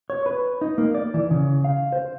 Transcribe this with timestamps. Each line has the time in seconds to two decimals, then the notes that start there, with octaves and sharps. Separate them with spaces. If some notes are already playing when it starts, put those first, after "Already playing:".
0.10 C#5
0.26 B4
0.61 D#4
0.78 A#3
0.95 D5
1.14 E3
1.31 C#3
1.64 F5
1.92 C5